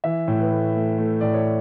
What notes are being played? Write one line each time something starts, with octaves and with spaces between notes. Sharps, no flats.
E3 E5
A2
B4
A3
A3
A3
A2 D5
C#5